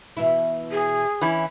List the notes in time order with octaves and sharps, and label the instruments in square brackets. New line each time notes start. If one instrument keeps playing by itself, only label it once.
[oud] B2 E3 E4
[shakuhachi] G#4
[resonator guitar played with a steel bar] E3 C#4 E4